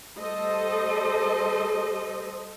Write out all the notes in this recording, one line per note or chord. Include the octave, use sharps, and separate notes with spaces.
G3 A4 C5 D#5